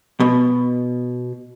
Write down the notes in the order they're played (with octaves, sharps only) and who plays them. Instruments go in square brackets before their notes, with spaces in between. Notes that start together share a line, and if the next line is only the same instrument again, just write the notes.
[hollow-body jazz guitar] B2